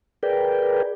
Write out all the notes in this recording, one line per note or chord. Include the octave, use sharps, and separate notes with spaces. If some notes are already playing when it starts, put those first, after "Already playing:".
G#4 A#4 B4 D5 G5